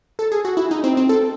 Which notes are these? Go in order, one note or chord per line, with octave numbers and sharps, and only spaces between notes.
A4
G#4
F#4
E4
D#4
C4
C4
A4